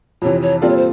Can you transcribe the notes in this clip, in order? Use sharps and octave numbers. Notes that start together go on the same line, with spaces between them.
F2 C3 E3 C#5
C#5
A#2 G3 C4 F4 A4 D5
C#5
C5